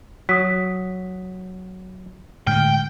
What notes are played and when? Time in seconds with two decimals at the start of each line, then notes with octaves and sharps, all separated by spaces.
0.29 F#3 D#6 B6
2.47 A2 D3 G#3 G5 F6